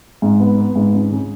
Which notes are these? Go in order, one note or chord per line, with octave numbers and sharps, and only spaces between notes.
G#2
B3
B3
G#2
C#2
C#3